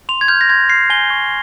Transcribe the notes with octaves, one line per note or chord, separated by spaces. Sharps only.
C6 F7
G#6
F6 G6
A#6
C6 G#6
F6 C7
G#5 G7
C#6 G6